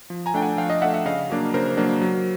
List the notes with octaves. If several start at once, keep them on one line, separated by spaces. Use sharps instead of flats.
F3
G#5 A#5
A3 D4 G5
F#5 G#5
F3 F5 G5
D#5 F5
A3 D4 E5 F#5
E5 F#5
C#3 D#5 F5
F#3 A#3 D4
C#3 A#4 C5
F#3 A#3 D4
F#3